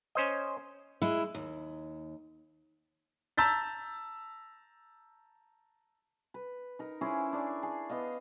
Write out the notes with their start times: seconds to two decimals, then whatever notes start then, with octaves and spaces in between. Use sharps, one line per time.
0.15 C#4 C5 D#5
1.02 G#3 E4
1.35 D#2
3.38 A5 A#5 E6 G6 A6 B6
6.34 B4
6.79 D#4 A#4
7.01 C#4 E4 G#4 C5
7.33 D4 D5 C#6
7.63 G#4
7.89 B3 D#5 F5